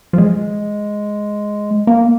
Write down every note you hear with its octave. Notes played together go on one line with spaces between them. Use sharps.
F3
G#3
A#3